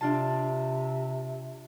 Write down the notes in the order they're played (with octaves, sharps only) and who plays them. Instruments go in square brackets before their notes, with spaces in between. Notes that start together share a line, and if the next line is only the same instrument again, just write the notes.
[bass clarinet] C3 [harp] D4 F4 A5